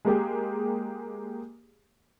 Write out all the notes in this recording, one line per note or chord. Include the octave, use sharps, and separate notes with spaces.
G#3 A#3 G4 G#4